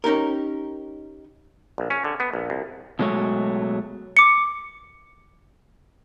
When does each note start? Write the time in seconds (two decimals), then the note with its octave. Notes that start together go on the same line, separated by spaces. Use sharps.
0.04 C#4 D#4 G4 A#4
1.78 A#1
1.90 C#4
2.04 D3
2.20 B3
2.34 A#1
2.50 C2
2.99 B2 F#3 G#3 A3 C#5
4.17 D6 C#7